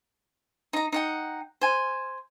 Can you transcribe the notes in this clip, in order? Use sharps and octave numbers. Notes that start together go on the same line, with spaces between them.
D#4 A#5
D#4 F#5 G5
C5 G#5